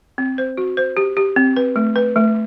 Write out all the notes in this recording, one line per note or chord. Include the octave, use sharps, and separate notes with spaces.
C4
C5
F#4
C5
G4
G4
C4
B4
A3
B4
A3